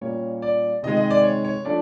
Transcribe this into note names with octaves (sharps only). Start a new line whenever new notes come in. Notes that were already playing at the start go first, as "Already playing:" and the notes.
A#2 G3 A#3 C#4 C#5
D5
C3 D#3 G#3 D#5
D#5
D5
C#5
C#5
F3 A3 D4 D5